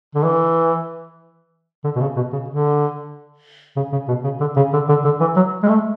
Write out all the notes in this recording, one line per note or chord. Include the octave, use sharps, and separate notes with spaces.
D3
E3
D3
B2
C#3
B2
C#3
D3
C#3
C#3
B2
C#3
D3
C#3
D3
D3
D3
E3
F#3
G#3
A3